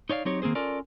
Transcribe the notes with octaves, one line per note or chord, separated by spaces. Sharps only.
D#4 C#5 D5 F5
F#3 C4 D#4 G4 C#5
D#3 A#3 C4 G#4 C5
C#4 F4 A4 A#4 D5